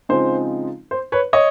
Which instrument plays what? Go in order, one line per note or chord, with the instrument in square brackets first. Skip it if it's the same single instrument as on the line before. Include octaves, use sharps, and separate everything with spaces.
[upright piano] C#3 F3 G#3 C4 D#4 C5
C5
B4 C#5
C#5 D#5